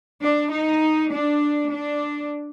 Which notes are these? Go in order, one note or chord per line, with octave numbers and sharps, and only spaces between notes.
D4
D#4
D4
D4